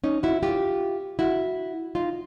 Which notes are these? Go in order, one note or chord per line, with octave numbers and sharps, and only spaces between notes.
C#4 D#4
E4 F#4
F4 G4
E4 F#4
D#4 F4